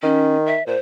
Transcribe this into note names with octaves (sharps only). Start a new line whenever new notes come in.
D#3 C#4
E5
A#2 C5